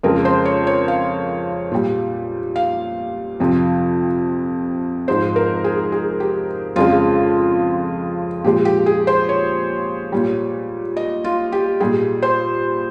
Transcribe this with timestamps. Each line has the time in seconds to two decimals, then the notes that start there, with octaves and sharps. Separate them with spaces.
0.03 F2 C#3 G#3 A#4
0.25 C5
0.45 C#5
0.67 C#5
0.88 F5
1.72 A#2 G3
2.56 F5
3.40 F2 C3 F3
5.08 G#2 F3 G#3 C5
5.36 A#4
5.64 G#4
5.92 G#4
6.20 G4
6.76 F2 C#3 F3 G#3 F4
8.44 A#2 F3 G#3 G4
8.65 G4
8.86 G#4
9.07 C5
9.29 C#5
10.12 A#2 G3
10.97 D#5
11.24 F4
11.52 G4
11.80 A#2 G3 G#4
12.23 C5